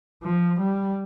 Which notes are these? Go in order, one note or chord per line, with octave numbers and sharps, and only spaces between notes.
F3
G3